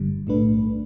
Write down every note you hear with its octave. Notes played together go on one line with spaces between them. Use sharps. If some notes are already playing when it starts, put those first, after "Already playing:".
Already playing: G1 G2 D3 G3
B1 A2 A3 D4 B4